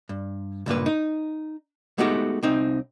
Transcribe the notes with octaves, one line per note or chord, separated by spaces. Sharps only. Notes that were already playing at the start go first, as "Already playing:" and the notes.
G2
C#2 G2 A#2 B4
D#4
G#3 A3 B3 D#4 F#4 G4
C2 C4 D#4